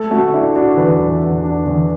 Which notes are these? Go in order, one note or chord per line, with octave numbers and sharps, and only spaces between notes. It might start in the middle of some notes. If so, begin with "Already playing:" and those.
Already playing: A3 A4
A3 F#4
D4 E4
D4 F#4
E2 B4
E3
E2
D4
E2